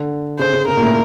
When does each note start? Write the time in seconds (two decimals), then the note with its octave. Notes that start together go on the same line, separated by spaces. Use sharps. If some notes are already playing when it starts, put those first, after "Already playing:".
Already playing: D3
0.39 C#3 C5
0.53 C#3
0.68 C#3 A#4
0.77 A#2
0.83 A2